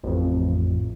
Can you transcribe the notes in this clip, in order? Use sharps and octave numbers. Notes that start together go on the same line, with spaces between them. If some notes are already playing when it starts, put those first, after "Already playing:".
A1 F2